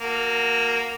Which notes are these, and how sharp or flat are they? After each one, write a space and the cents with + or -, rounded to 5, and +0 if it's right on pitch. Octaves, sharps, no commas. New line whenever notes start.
A#3 +0 F#4 +0 A#4 -45